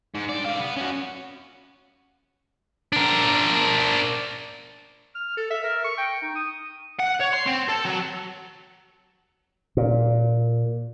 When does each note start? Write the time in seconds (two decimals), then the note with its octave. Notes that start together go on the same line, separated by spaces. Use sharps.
0.15 G#2
0.29 G2 D5
0.46 G4 F5
0.60 B3
0.77 C#4 F#4
2.93 D4 A#4
5.15 F6
5.37 A4
5.50 E5
5.63 A#4
5.84 C#6
5.97 G5
6.22 D#4
6.35 D#6
7.00 F#5
7.21 C#5
7.34 C6
7.47 C4
7.69 A4
7.86 F#3
9.77 A#2